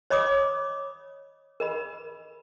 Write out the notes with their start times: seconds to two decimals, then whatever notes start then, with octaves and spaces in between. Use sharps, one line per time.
0.10 C#5 D#5 B5 D6 D#6
1.60 A#4 D#5 B5